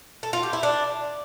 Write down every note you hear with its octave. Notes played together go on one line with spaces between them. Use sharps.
A4
F4
G4
E4
D4